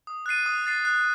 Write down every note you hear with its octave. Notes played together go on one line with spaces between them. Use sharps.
D#6
F#6 A6 C7 D#7
D#6
F#6 A6 C7 D#7
F#6